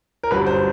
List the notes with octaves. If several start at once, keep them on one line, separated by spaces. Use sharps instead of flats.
A#4
G1 F#2 D3 G3 B4
C5